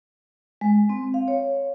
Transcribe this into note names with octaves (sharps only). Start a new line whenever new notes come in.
G#3
C4
F5
C#5